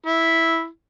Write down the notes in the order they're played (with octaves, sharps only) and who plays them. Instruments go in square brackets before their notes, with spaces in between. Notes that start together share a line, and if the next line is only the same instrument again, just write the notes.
[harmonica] E4